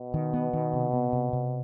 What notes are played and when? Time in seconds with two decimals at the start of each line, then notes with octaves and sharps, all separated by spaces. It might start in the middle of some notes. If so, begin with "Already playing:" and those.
Already playing: B2
0.14 D#3
0.34 B3
0.53 D#3
0.73 C3
0.93 B3
1.13 C3
1.33 C3